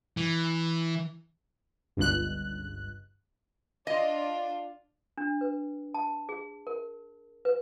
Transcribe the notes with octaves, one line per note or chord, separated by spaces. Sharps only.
E3
G1 C#2 F#6
D4 F4 D#5
D4
B4
A5
G#4
A#4
B4